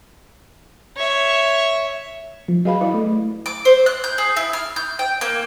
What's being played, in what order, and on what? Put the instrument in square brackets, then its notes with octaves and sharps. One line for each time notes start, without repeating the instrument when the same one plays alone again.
[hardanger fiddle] C#5 E5
[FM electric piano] F3
[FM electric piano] F#3 G#4 B4 [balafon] D#5 F5 B5
[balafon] E4 [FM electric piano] B4 D5 D#5
[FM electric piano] A3
[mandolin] D6
C5
F#6
G6
G#4
E4
F6
G6
G5
A#3